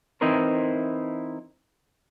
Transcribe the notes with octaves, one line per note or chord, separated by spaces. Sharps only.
E3 C4 D#4 E4 A#4 C5